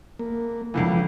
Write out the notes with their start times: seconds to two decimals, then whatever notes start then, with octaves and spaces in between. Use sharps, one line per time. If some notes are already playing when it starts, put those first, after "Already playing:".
0.19 A#3
0.74 C#2 D3 E3 F3